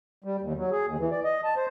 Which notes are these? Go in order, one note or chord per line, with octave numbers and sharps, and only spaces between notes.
G3
D#2
F#3
G#4
D#2
E3
D5
D#5
A5
C5